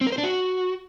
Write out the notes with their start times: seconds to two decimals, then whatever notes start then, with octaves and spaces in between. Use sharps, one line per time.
0.01 C4
0.07 A#4
0.12 C5
0.18 D4
0.24 F#4